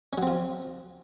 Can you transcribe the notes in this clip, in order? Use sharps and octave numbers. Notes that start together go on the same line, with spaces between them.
F3 F#3 C4 C#4